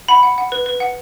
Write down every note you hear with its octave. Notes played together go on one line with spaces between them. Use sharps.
F#5 B5
F#5
F#5
B4
B4
F#5